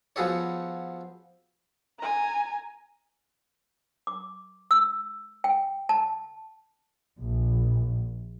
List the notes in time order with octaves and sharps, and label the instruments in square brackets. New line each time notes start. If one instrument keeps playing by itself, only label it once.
[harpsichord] F3 B3 F#4 G#4 A4 C#5
[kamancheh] G#5 A#5
[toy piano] D6
E6
G5
A5
[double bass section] A#1